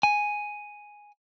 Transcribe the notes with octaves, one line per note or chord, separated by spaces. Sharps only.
G#5